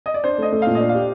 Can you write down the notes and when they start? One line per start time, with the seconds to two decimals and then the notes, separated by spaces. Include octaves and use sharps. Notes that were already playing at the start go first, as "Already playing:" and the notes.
0.06 D#5
0.14 D5
0.24 D4 C5
0.38 A3 D#5
0.52 A3
0.62 A#2 F5
0.75 D4 D#5
0.89 F5
0.94 G4